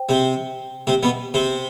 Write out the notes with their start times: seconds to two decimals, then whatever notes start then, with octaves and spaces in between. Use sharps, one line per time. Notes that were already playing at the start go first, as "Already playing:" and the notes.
Already playing: C5 G5
0.09 C3 C4
0.87 C3 C4
1.03 B2 B3
1.34 C3 C4